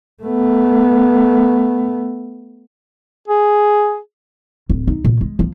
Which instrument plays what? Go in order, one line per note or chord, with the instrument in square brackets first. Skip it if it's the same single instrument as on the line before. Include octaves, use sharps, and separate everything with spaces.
[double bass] A3 B3
[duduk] G#4
[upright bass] D1
D#4
A#2
G#3
F3